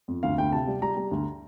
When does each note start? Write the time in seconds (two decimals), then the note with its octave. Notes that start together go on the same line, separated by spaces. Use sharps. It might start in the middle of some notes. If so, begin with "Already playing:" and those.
0.08 F2
0.23 D2 F5
0.38 D2 G5
0.52 C3 A5
0.67 G3
0.82 G3 A#5
0.97 G3
1.11 D2